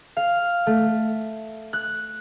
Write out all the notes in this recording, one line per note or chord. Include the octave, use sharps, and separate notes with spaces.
F5
A3
F#6